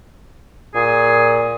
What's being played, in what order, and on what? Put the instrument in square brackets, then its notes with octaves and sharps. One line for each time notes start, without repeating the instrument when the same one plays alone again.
[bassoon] A#2 [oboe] G#4